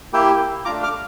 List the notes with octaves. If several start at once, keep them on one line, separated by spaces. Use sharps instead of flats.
A#3 E4 G4 E5 G5
A3 D4 F4 A#5 D6
D6 F6